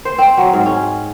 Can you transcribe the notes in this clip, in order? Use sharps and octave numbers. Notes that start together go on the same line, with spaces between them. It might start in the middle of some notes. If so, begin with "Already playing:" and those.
C5
C4
F#3
G#2
C#4